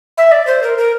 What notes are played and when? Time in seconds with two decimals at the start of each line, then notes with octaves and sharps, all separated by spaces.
0.18 E5
0.32 D5
0.47 C5
0.63 A#4
0.78 A#4